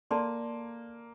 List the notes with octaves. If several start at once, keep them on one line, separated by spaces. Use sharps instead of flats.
A#3 A4 D5 A5 C6